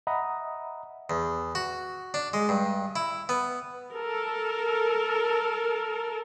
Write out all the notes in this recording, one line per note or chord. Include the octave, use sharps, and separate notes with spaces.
D#5 E5 F#5 A#5 B5 D#6
E2
F#4
D4
G#3
G2
E4
B3
A4 A#4